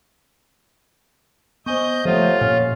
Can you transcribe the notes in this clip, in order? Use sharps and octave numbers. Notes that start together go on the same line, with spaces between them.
B3 C5 D#5 G#5 C#6 G6
C3 F3 G#3 A3 F4 A4 C#5 F#5
A#2 C#4 F6